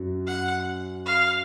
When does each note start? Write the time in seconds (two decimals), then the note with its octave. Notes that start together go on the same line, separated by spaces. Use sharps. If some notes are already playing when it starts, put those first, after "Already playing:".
Already playing: F#2 F#3
0.27 F#5
1.06 F5